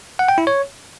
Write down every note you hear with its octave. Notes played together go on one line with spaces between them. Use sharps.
F#5
G5
E4
C#5